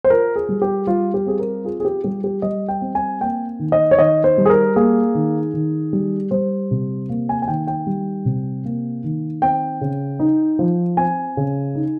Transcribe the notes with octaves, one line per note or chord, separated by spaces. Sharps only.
C5
F4 A#4
G#4
G3
G4
G3 F4
G4
C4 G#4
A#4
F4 G#4
G#4
G4
G3 G4
G4
G3 D#5
G5
C4
G#5
A#3 G5
D#3
D#5
C#5
D#3 D#5
C5
G3
G#4
A#4
A#3 G#4
D#3
D#3
G3
G3 C5
C3
A#3
G#5
G#5
D#3 G5
G5
G3
C3
A#3
D#3
C4 G5
C#3
D#4
F3
C4 G#5
C#3
D#4